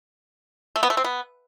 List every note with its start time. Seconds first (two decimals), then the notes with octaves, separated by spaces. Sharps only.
0.76 A3
0.83 B3
0.90 A3
0.97 C4
1.04 B3